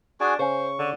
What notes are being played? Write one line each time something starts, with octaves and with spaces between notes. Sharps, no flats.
D4 F#4 G#4 G#5
C#3 C#4 C5 C#6
D3